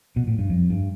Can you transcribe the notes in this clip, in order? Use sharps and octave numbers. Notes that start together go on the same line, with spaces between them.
B2
A2
G2
F2
G2